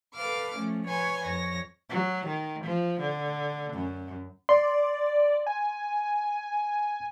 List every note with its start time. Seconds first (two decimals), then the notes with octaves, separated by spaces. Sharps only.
0.14 A4 B4 F5 D6 F6
0.55 F3 A3 C#4
0.86 B4 C#5 G#5 C6
1.22 F2 C#5 A#6
1.90 F#3
2.27 D#3
2.65 F3
3.01 D3
3.74 F#2
4.49 D5 C6
5.46 G#5